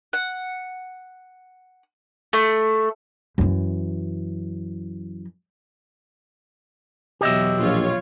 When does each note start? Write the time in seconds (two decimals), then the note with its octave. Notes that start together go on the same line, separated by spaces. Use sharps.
0.13 F#5
2.33 A3
3.38 F#2 E3
7.21 E2 B2 F#3 G4 D#5 E5
7.59 A#1 F4 C#5